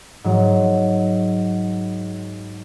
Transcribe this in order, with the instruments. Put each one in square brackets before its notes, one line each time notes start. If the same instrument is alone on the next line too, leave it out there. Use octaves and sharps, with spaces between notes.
[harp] G#2 F#3